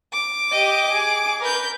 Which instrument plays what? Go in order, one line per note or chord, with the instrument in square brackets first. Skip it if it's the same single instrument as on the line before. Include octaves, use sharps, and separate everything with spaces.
[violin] D6
[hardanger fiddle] G4 D#5
G#4
[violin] A#4 G6 [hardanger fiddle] B4